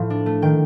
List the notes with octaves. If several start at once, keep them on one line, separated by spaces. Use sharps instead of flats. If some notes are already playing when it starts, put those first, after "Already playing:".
Already playing: A2 F3 A3
D4
A3
D#3 G5